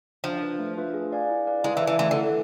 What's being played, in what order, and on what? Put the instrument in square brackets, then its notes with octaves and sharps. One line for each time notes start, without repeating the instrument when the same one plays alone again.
[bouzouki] F3 [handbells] D4
[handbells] F4 B4
A3
D4 F4 B4 E5
G#4
D5 F5 G#5
E4
B4 D5 F5
[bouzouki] G#3 [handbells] E4
[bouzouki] E3
[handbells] B4 D5 A5
[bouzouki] E3
[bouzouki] E3 [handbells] A3
[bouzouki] D3
[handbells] E4 B4